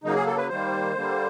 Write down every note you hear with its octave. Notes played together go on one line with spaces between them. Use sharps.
C#3 F#3 A#3 D#4
G#4
A4
B4
D#3 G3 A#3 C5
D3 G3 A#3